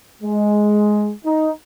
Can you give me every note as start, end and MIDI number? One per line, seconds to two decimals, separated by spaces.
0.23 1.13 56
1.25 1.50 63